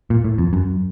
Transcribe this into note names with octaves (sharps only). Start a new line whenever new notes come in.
A#2
A2
F2
F#2